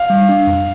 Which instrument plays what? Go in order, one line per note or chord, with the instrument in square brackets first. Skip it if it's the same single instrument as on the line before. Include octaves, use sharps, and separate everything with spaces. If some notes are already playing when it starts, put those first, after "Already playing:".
Already playing: [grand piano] F5
[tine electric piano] G3
D4
F2